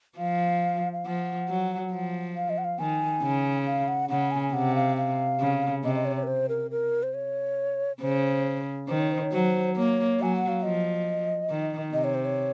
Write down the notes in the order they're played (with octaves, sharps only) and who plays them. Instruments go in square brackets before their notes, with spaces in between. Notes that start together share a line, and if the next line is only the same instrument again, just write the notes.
[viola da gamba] F3 [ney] F5
[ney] F5
[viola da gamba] F3 [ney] F#5
[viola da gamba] F#3
F3
[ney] F5
D#5
F#5
F5
[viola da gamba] D#3 [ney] G#5
[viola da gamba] C#3
[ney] F5
F#5
[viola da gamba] C#3 [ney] F#5
[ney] G#5
G#5
[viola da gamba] C3 [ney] F#5
[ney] F5
F5
[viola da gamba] C#3
[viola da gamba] C3 [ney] D#5
[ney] D#5
C#5
C#5
A#4
C5
A#4
A#4
C5
C#5
[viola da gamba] C#3 [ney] C5
[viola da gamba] D#3 [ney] C5
[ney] C#5
C5
C#5
[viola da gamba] F#3 [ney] C5
[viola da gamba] A#3 [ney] C#5
[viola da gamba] F#3 [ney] G#5
[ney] F#5
F5
[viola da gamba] F3 [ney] D#5
[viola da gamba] D#3
[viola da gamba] C3 [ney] D#5
[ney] C#5
C5
C#5